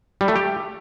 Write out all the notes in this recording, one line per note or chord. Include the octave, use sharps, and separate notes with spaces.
G3
A3
G4